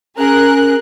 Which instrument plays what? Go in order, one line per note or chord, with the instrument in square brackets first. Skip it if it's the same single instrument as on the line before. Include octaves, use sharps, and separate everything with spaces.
[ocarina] C#4 [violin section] G#4 A#4 F#6